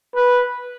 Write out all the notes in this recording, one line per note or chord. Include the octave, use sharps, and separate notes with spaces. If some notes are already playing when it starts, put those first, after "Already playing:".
B4